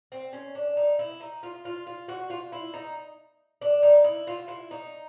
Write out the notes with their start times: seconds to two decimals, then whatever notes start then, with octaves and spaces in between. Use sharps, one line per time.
0.12 C4
0.33 C#4
0.55 D4
0.77 D#4
0.99 E4
1.21 D#4
1.43 F4
1.65 F4
1.87 F4
2.08 F#4
2.30 F4
2.52 E4
2.74 D#4
3.62 D4
3.83 D#4
4.04 E4
4.27 F4
4.48 E4
4.71 D#4